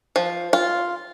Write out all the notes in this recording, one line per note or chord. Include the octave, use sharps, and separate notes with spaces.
F3
F4